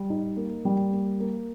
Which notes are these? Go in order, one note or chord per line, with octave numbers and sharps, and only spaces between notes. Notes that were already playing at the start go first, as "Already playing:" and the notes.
Already playing: G3
D#4
A#3
G3
A#3
A#3